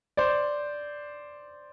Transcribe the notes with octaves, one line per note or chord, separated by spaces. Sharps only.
C5 D5